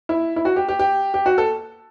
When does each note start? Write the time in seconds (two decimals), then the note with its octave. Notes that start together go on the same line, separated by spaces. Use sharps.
0.09 E4
0.36 E4
0.45 F#4
0.56 G4
0.69 G4
0.79 G4
1.14 G4
1.26 F#4
1.38 A4